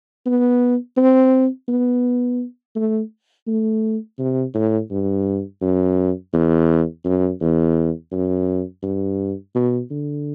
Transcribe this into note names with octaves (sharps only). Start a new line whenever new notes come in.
B3
C4
B3
A3
A3
C3
A2
G2
F#2
E2
F#2
E2
F#2
G2
B2
D3